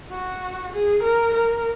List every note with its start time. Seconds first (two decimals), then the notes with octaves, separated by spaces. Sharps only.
0.11 F#4
0.73 G#4
1.03 A#4
1.34 A#4